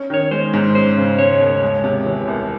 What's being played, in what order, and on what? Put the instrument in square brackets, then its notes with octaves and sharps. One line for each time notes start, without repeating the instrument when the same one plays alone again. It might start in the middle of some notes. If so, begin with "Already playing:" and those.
Already playing: [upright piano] C#4
[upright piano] D#3 [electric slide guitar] C#5
[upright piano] G#3 [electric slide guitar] C5
[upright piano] G#2
[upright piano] C#4 [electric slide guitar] C5
[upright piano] C#3
[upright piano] G#3 [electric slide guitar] C#5
[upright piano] D#2
G#3
C3
E3
C2